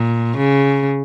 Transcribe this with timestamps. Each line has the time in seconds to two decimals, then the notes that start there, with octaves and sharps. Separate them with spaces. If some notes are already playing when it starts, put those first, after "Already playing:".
Already playing: A#2
0.37 C#3